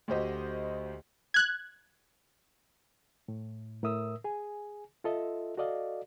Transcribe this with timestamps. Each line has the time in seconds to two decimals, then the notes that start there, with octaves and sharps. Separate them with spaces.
0.08 D2 F#4 G4 C5 D#5
1.34 F#6 G#6
3.28 A2
3.83 A2 A#4 E5 D#6 E6
4.24 G#4 G#5
5.04 F4 A4 D#5 E5
5.57 F#4 A4 D5 D#5 F5